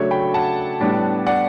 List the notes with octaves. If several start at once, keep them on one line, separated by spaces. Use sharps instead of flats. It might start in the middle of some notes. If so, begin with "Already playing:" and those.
Already playing: C#3 F#3 A3 D4 C#5 E5
G5 B5
F#5 A5
A2 G3 B3 D4
D5 F#5